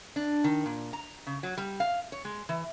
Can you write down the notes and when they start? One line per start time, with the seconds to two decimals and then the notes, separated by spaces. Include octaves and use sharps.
0.16 D4
0.44 D#3
0.66 A#2
0.93 A#5
1.27 C#3
1.43 F#3
1.57 G3
1.80 F5
2.12 C#5
2.25 G#3
2.49 E3